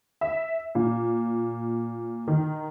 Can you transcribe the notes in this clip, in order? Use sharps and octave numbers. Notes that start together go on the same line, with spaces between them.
E5
A#2
D#3